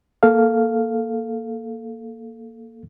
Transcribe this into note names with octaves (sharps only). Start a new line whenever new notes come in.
A#3 A4 F5